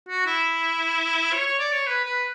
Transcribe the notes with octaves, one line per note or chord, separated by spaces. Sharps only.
F#4
E4
C#5
C#5
D5
C#5
B4
B4